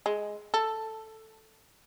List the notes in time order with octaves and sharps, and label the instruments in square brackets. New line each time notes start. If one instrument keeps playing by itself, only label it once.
[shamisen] G#3
A4